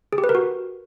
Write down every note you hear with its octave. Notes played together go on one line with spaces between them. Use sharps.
G#4
G4
B4
A#4
F#4